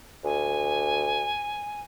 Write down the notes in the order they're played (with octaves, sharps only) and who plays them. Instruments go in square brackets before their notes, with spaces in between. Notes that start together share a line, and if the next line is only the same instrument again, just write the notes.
[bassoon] D2 [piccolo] G#5